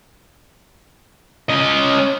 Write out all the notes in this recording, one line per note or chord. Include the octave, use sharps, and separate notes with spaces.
C#4 D#5